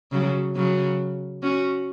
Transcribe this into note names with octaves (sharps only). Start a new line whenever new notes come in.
C#3 F#3
C#3 F#3
C#4 F#4